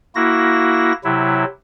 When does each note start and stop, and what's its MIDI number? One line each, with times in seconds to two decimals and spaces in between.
0.15 0.92 58
0.15 0.92 64
0.15 0.92 66
0.15 0.92 94
1.04 1.44 48
1.04 1.44 54
1.04 1.44 64